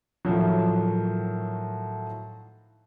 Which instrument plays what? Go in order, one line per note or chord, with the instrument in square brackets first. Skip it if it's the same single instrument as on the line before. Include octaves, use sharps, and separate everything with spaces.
[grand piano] A2 D#3 F3 F#3